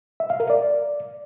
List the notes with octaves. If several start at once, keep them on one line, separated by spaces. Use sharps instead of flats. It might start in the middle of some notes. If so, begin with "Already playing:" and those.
E5
F5
A#4
D5